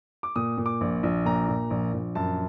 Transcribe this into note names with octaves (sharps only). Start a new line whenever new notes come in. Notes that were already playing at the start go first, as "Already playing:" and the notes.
D6
A#2 D#6
A#2
D6
A#1
A#1
A#2 A#5
A#2
A#1
A#1
F#2 A5